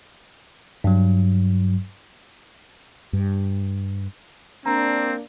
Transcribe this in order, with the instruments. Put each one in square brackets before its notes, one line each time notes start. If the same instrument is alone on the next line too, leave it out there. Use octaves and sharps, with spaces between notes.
[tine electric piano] G2 F#3
[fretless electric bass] G2
[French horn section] A#3 D4 [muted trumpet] C4 [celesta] A#5